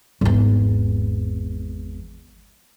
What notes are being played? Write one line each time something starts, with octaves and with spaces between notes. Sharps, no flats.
G#1 E2